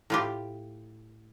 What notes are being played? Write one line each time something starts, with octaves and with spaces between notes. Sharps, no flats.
A2 F4 G4